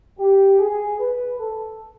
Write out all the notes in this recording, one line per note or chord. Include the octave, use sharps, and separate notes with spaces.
G4
G#4
B4
A4